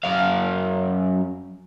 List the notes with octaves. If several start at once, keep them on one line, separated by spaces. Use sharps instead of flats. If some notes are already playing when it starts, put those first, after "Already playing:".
F#2 F5